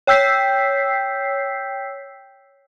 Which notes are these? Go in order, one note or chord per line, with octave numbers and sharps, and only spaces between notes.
C#5 G5 E6 G6 B6 C7